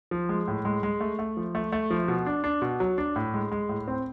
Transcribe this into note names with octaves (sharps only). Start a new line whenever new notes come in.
F3
G#3
A2
G#3
G#3
A3
A3
F3
A3
A3
F3
B2
D4
D4
B2
F#3
D4
A2
G#3
G#3
A2
C4